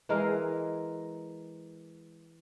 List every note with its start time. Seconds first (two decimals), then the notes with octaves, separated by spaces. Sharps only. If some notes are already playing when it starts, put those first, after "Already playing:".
0.09 E3 G#3 A#4 F5